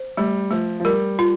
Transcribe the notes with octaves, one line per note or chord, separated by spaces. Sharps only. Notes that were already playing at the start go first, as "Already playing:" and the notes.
Already playing: C5
G3 A3
F3 A3
F3
G3 A#4
F4